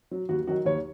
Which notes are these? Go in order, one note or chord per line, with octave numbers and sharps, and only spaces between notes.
F#3
D#2 F#4
D#3 F#3 F#4
D#2 C#5